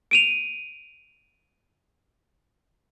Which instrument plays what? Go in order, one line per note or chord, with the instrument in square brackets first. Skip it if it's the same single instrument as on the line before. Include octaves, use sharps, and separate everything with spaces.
[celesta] D7 D#7 F7